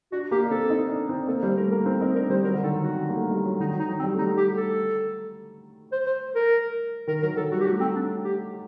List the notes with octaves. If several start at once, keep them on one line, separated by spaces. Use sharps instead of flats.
D4 F#4
A#3 G4
D4
C4 A4
D#4
D4
C4
A#3 A4
G3 C5
A3 A#4
A#3 A#4
C4
D#4 A#4
D4 A#4
G3 C5
F#3 A#4
D3
D#3 A4
F#3 F#4
G3
A#3
A3
G3
F#3
D#3 D#4
F#3
D#4
F#3
C4
G3
A3 D#4
G3
G4
A4
C5
C5
A#4
D#3 A#4
F#3 A#4
F#3 A4
G3 F#4
G4
A3 F#4
C4
D4
G4